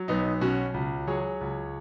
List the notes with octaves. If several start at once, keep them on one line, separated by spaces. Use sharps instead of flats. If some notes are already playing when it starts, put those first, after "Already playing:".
Already playing: F#3
B1 B3 D#4
B2 C#4 F#4
C#2
F#3 G#4 C#5
C#2